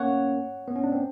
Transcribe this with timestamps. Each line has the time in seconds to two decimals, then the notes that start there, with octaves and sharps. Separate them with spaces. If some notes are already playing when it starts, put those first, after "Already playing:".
Already playing: A#3 C#4 C#5 F#5
0.68 B3
0.76 C#4
0.84 D4
0.92 C4